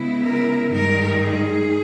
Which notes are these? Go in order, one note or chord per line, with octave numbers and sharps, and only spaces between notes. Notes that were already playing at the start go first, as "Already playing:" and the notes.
Already playing: C#3 G#3 B3 E4
A#4
G2 D#3 G#3 D#4 A#4
G#4